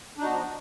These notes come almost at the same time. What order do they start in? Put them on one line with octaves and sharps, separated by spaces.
D4 D#4 F#4 B3 F3